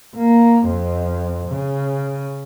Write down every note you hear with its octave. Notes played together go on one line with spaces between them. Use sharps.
A#3
F2
C#3